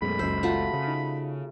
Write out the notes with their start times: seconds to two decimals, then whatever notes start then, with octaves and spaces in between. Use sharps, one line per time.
0.02 F#2 B2 G#3 A3 B5
0.19 F#1 C#2 F#2 G#3 A4 C5 E6
0.43 A3 F4 F#4
0.73 C#3
0.87 D#4